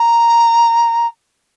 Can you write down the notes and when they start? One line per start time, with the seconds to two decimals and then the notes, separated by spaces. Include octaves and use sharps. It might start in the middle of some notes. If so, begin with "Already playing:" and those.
Already playing: A#5